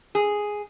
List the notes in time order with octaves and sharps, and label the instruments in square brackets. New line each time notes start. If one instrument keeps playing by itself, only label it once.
[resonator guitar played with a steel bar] G#4